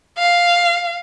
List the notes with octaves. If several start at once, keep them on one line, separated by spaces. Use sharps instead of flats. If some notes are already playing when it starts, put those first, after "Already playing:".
F5